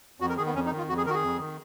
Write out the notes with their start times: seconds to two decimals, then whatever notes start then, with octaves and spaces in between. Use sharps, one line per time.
0.20 F2 F#4
0.29 A#4
0.38 D#3 G#4
0.46 B3
0.55 F2 C#4
0.66 D#4
0.72 D#3
0.78 F4
0.89 F2 F#4
0.97 G#4
1.06 D#3 F#4 A#4
1.14 G#4
1.23 F2
1.40 D#3